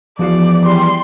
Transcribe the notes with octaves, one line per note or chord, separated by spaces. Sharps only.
E2 F3 F#4 D5 F5
E3 G3 C6